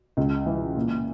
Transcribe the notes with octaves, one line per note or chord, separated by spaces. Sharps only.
C#2
E3
A#2